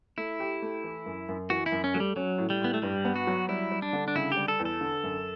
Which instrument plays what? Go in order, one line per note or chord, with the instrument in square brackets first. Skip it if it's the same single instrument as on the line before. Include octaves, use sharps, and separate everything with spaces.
[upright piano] A3 [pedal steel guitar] E4
[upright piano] G4
A3
E3
F#2
F#2
[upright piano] E3 [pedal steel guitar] F#4
[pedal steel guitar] E4
[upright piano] F#2
[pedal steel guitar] C#4
[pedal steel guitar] F#3 [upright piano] A3
[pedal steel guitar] G3
[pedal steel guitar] F#3 [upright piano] C#4
[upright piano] A2
[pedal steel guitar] G3
[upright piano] A2 [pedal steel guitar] B3
[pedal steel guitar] A3
[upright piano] G2 [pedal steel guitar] G3
[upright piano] B3
[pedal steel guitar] F#4
[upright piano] F#3
[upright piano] G3 [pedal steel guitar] E4
[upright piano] G3
[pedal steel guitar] D4
[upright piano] D3
[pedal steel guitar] D4
[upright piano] C#3 [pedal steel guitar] E4
[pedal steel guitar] G4
[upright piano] G3
[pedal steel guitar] A4
[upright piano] E2
[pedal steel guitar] A4
[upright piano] D3
F#2